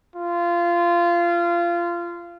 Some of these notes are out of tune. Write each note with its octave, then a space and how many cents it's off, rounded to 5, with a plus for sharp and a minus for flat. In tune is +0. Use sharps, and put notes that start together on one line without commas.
F4 -20